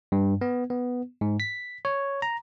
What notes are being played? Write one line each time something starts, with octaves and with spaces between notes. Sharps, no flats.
G2
B3
B3
G#2
B6
C#5
A#5